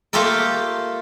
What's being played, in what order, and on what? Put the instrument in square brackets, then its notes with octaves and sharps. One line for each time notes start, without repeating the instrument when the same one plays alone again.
[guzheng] A3 A#3 F4 G4 A4 A#4